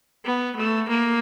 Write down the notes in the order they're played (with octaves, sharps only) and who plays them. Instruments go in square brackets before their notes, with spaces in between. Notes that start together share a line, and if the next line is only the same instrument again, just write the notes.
[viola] B3
A3
A#3